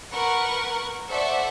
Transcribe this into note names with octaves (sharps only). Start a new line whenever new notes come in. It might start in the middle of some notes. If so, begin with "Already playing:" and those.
A#4 B4 F#5 C#6
A4 C5 D5 E5 F#5 C#6